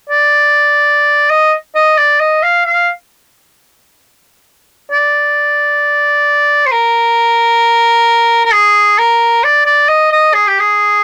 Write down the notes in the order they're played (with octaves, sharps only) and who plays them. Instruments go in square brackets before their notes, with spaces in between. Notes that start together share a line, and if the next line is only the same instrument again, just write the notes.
[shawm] D5
D#5
D#5
D5
D#5
F5
F5
D5
C5
A#4
A#4
G#4
A#4
D5
D5
D#5
D#5
G#4
G4
G#4